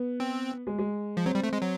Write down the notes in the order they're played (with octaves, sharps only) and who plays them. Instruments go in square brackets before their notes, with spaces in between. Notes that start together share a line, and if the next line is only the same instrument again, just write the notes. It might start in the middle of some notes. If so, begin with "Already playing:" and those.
Already playing: [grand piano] B3
[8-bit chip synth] C4
[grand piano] G#3
G#3
[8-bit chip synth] F3
[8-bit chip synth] F#3 [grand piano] C4
[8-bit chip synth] G3
A3
G#3
F#3